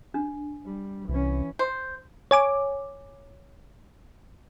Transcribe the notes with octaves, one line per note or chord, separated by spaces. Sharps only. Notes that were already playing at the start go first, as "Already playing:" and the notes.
D4
G3
C2 E3 C#4
C5
C#5 G#5 D6